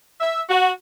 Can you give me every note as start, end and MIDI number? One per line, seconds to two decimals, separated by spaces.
0.20 0.40 76
0.49 0.70 66